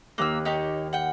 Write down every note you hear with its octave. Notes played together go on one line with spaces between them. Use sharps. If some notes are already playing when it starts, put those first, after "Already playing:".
D#2 A#3 E6 F#6
D#4 G4 C#5
F#5 G5